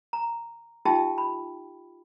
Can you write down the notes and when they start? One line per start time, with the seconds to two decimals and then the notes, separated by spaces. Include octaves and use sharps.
0.13 A#5
0.85 D#4 F4 G4 E5 G5 A5
1.18 B5